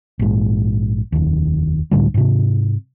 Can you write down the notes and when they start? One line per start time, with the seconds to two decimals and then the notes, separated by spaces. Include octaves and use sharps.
0.19 A#1 G#2
1.12 F1 D#2
1.91 C#2 A2 D3 G3
2.14 G#2 C3